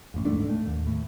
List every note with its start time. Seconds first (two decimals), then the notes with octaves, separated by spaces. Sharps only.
0.14 A1 F2
0.25 D1 G#2 A3 D4
0.48 A2 A3
0.67 D#2
0.87 A2